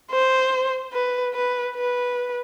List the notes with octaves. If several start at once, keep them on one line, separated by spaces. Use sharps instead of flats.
C5
B4
B4
B4